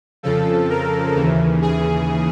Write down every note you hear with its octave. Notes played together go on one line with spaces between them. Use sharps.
F2 C#3 F3 A4
A#4
D#2 C#3 E3
G#4